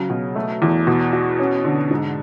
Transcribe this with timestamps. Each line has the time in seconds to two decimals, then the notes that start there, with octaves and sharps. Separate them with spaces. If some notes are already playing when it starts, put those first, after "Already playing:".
Already playing: C#3 F#3
0.10 B2
0.36 A3
0.62 E2
0.87 B2
1.13 F#4
1.39 C#4
1.64 D3
1.91 G#2